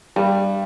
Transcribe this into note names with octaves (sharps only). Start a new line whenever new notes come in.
G2 G3